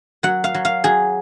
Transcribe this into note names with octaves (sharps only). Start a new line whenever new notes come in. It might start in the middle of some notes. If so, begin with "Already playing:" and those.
F#3 F#5
F5
F#3
F5
F#3 G#4